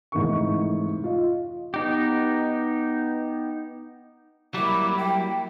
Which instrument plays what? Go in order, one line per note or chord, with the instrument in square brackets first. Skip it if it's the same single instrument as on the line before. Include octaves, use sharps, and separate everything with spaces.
[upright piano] F1 G#2 E3 A#3 C#6
F4 D#5
[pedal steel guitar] B3 D#4 G4
[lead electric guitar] F#3 G3 [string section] A#3 E4 [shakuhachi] D6
[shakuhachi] G5